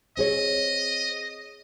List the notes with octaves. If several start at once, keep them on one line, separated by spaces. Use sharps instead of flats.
C4 G#4 C#5 D#5